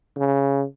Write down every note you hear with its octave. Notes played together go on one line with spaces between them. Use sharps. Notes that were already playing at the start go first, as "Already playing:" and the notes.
C#3